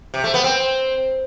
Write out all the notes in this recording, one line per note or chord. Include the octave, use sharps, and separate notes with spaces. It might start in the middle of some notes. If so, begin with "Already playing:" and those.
C3
A3
B3
C4